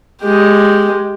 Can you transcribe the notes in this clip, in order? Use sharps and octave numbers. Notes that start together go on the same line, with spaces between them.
G#3 G4